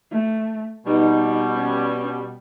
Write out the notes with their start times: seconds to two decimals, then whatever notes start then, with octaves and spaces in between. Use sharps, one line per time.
0.11 A3
0.86 B2 G3 D#4
1.54 C#4